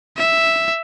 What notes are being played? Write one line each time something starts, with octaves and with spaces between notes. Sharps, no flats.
E5